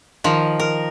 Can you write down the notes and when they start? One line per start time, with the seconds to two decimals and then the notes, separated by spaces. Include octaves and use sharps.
0.24 D#3 F3
0.59 A#4